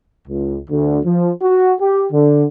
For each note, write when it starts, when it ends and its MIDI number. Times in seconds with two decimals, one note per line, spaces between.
0.28 0.60 37
0.70 1.00 38
1.05 1.32 53
1.41 1.74 66
1.80 2.05 67
2.12 2.45 50